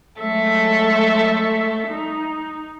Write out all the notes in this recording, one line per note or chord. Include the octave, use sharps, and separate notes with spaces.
F#3 G#3 A3 A4 E5
D#4